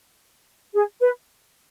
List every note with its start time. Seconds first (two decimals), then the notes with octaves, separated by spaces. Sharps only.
0.74 G#4
1.01 B4